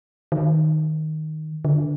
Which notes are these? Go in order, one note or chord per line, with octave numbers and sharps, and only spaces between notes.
D#3
D3